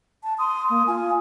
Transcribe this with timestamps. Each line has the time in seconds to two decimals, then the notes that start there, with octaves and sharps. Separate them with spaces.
0.23 A5
0.39 C6 D#6
0.70 A#3
0.87 F4 G#5